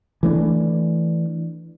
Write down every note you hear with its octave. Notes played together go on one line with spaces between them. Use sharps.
E3 A3 C#4 D4